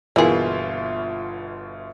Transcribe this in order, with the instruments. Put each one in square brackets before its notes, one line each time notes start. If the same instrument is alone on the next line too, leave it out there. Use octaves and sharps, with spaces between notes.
[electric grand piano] G1 B2 F4 [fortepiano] E3 [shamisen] A#3 G#4 [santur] E5